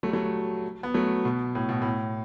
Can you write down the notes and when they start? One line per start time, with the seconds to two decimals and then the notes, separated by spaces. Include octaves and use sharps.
0.03 F#3 A3
0.08 G3
0.13 F#3 A3
0.83 B3
0.94 F#3 A3
1.25 B2
1.55 A2
1.69 B2
1.82 A2